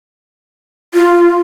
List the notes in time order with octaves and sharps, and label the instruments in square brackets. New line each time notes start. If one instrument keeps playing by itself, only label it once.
[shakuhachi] F4